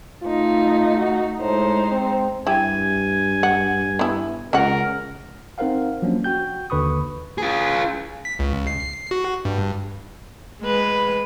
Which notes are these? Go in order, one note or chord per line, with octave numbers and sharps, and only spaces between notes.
A3 D#4 F4
F#4
A2 G#3 D#4 C5
C4
G2 E4 G4 G#5
F#5
B3 E4
C#2 C#4 A#4 F#5
C4 D#4 A#4 C5 F5 F#5
F3 F#3 A#3 C#4 D4
F#4 G5 G6
D#2 D3 B4 B5 C#6 D#6
F4 G#4
B6
C#2
C7
F#4
G2
G#3 B4